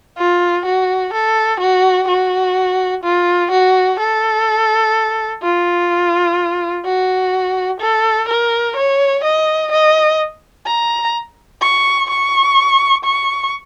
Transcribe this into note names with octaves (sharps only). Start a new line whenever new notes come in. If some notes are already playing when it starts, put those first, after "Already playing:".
F4
F#4
A4
F#4
F#4
F4
F#4
A4
F4
F#4
A4
A#4
C#5
D#5
D#5
A#5
C#6
C#6
C#6